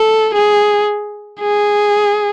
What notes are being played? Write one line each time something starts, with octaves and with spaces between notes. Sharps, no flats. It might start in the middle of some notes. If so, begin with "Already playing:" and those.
Already playing: A4
G#4
G#4